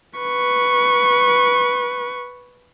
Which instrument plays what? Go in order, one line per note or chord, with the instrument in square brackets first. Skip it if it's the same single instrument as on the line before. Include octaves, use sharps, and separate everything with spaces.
[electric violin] B4 C#6